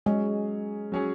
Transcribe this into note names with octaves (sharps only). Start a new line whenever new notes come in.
F#3 G#3 C#4 G#4
F#3 C#4 G#4